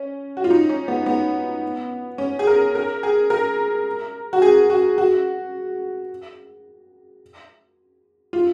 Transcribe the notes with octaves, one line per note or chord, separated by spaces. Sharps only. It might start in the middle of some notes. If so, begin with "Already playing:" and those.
Already playing: C#4
F#4
F4
D#4
C#4
B3
B3
C#4
G#4
A#4
A#4
G#4
A#4
F#4
G#4
F#4
F#4
F4